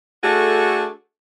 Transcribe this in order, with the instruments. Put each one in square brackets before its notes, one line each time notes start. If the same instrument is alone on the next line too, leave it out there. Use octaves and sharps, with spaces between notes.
[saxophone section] A3 D4 F#4 G#4 A4